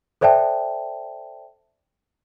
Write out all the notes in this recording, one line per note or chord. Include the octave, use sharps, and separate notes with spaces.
A4 C5 D5 E5 G5 A5